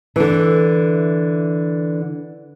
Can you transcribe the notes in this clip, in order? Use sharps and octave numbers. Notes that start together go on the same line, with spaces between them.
D3 E3